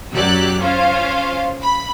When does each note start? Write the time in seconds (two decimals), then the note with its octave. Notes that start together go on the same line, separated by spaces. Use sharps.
0.14 F#2 F#3 G4 D5 E6 F#6
0.59 C#4 F4 C5 F5
1.60 B5